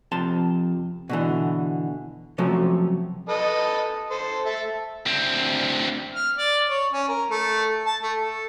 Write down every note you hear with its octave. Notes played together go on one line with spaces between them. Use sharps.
F2 C3 A5 C6
B2 D3 E3
C3 F3 F#3 A3 C#4
A4 B4 D#5
A4 C5
A4 E5 A5
D2 C4
F6
D5
C#5
C#4
A#4
A3
A5
A3
A4